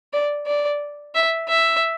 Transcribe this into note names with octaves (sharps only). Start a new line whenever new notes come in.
D5
D5
E5
E5